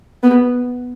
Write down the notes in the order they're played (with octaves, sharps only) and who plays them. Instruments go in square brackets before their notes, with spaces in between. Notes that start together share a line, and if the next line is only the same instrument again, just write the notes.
[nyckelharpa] B3